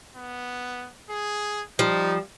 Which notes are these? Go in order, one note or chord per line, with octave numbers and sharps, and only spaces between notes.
B3
G#4
F3 G3 D#4